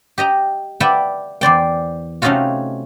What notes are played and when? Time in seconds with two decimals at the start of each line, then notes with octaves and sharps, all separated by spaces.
0.18 G4 D#5 G5 A#5
0.80 B4 D5 E5 F#5 G5
1.41 E2 C5 D5 G5
2.22 C3 A3 C#4 D#4 F4 F#4